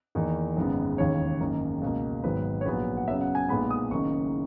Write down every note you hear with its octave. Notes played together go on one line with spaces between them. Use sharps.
E2 D#3 A#3
G#1 F#2 C#3 G#3 B3
E1 D#2 C#3 C#5
G#1 F#2 D#3 A#3
C#2 B2 A#3
G#1 G#2 F#3 B3 B4
C#5
A#1 A#2 F#3 B3 B4
F#5
F#2 C#3 F#3 B3 E5
F#5
G#5
B1 A#2 G#3 B3 B5
D#6
F#1 F#2 D#3 A#3 C#6